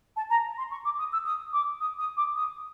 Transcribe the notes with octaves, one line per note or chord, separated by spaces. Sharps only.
A5
A#5
C6
C#6
D6
D#6
E6
D#6
D6
D#6
D#6
D6
D#6